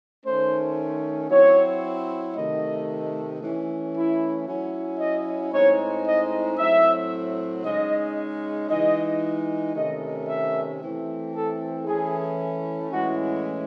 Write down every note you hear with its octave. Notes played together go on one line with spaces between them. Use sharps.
D#3 A3 C#4 C5
F#3 C4 E4 C#5
C3 D#3 A3 D#5
E3 A3 C#4
E4
F#3 C#4 E4
D#5
A2 G#3 C4 D#4 C#5
D#5
A2 F#3 C4 E5
C#3 G#3 D#4 D#5
E3 G#3 D#4 D#5
C3 D#3 A3 C#4 D#5
E5
E3 A3 C4
A4
E3 A3 C#4 E4 G#4
A2 E3 G#3 C#4 E4 F#4